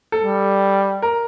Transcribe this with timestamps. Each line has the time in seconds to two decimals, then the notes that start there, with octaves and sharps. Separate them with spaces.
0.12 A4
0.22 G3
1.02 A#4